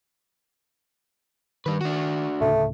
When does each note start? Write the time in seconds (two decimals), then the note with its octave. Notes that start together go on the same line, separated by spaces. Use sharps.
1.66 G2 D#3 B4
1.81 D4 F#4
2.41 D2 A2 C#3 A3